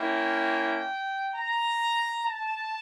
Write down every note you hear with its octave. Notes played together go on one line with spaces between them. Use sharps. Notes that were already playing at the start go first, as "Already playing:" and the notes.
Already playing: A#3 C#4 E4 G5
A#5
A5